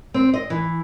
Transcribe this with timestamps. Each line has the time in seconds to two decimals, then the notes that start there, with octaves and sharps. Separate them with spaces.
0.14 C4
0.34 D#5
0.50 E3